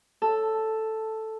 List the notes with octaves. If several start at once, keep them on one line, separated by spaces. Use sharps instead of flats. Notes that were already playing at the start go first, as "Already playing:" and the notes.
A4